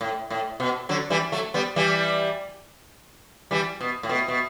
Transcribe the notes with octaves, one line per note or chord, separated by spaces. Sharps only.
A2
A2
B2
D3 F#3
E3 G3
F#3 A3
G3 B3
E3 G3
E3 G3
B2
A2
B2
B2